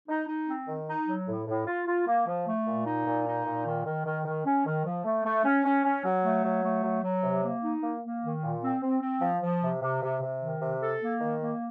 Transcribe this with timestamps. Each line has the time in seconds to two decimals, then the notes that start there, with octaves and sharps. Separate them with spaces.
0.09 D#4
0.28 D#4
0.48 C4
0.68 D#3
0.88 D#4
1.08 F#3
1.27 A2
1.47 A2
1.66 F4
1.86 F4
2.07 A#3
2.27 F3
2.47 A3
2.66 A#2
2.86 D#4
3.06 A#2
3.26 D#4
3.46 A#2
3.66 D#3
3.85 D#3
4.06 D#3
4.25 D#3
4.46 C#4
4.66 D#3
4.85 F3
5.05 A3
5.25 A3
5.45 C#4
5.65 C#4
5.85 C#4
6.04 F#3
6.24 A3
6.44 F#3
6.63 A3
6.83 F#3
7.03 F#3
7.23 C3
7.43 A#3
7.63 D#4
7.83 A#3
8.03 A#3
8.23 D#3
8.43 A#2
8.62 C4
8.83 C4
9.02 C4
9.22 F3
9.42 F3
9.63 C3
9.82 C3
10.02 C3
10.22 C3
10.41 D#3
10.61 C3
10.81 A4
11.02 A#3
11.20 D#3
11.41 A#3